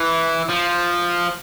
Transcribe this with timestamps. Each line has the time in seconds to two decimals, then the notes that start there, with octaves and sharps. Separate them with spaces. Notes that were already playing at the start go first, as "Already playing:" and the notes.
Already playing: E3
0.49 F3